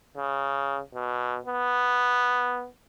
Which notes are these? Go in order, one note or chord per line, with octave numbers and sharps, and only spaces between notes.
C#3
B2
B3